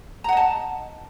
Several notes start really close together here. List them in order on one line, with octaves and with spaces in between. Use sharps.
A#5 F#5 D#5 A5